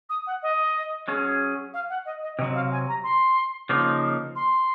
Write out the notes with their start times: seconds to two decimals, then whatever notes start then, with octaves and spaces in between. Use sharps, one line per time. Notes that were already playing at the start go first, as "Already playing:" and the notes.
0.10 D#6
0.27 F#5
0.43 D#5
1.08 F#3 C#4 G#4
1.74 F5
1.89 F#5
2.06 D#5
2.23 D#5
2.39 C3 F#3 C4 D#5
2.55 F5
2.72 G#5
2.88 A#5
3.04 C6
3.69 C#3 F3 A#3 D#4
4.36 C6